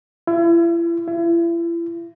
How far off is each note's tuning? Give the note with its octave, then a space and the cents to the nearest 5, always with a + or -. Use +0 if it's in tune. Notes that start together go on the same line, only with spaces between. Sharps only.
E4 +40
E4 +40